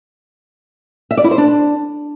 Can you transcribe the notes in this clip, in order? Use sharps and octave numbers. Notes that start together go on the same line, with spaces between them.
E5
D5
E4
C5
D4